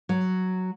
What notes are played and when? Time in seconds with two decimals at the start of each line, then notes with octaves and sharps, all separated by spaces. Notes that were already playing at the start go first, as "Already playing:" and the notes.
0.09 F#3